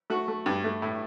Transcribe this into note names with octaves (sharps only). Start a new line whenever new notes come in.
A3 F#4
A3
G2
A3
A2